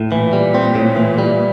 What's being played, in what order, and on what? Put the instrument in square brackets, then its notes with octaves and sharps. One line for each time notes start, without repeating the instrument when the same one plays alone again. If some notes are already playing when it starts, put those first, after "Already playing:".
Already playing: [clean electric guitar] A2
[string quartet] A#2 [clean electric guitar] E3
[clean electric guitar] G3
C4
A2
E3
G3